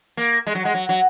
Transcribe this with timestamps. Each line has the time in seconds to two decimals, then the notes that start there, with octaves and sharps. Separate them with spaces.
0.17 A#3
0.47 G#3
0.55 F#3
0.65 G#3
0.74 F#3
0.89 F#3